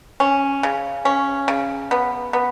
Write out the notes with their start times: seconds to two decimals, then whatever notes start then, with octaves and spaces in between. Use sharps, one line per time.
0.20 C#4
0.63 C#3
1.05 C#4
1.48 C#3
1.91 B3
2.33 B3